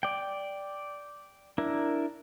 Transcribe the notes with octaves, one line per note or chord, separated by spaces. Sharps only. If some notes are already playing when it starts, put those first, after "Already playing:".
D5 G5
D4 E4 A#4